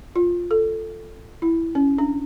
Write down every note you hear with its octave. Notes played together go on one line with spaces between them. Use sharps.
F4
A4
E4
C#4
D4